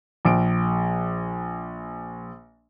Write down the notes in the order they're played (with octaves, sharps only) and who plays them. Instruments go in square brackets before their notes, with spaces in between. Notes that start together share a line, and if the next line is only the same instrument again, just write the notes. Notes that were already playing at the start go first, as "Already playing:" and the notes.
[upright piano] A#1 D7